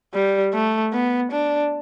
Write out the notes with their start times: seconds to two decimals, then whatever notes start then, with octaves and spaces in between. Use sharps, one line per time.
0.14 G3
0.53 A3
0.93 B3
1.32 D4